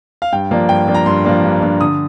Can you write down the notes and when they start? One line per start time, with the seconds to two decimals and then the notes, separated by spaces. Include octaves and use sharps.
0.22 F5
0.32 G2 G5
0.51 F3 A#3 D4
0.69 G2 G5
0.88 F3 A#3 D4
0.94 A#5
1.06 G2 C6
1.25 F3 A#3 D4
1.44 G2
1.62 F3 A#3 D4
1.81 D3 D#6